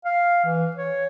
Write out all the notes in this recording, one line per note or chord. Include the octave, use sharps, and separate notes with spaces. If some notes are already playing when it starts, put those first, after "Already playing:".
F5
E3
C#5